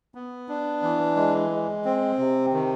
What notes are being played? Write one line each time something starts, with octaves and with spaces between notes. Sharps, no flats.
B3
D4
E3
G#3
G#3
C4
C3
D#3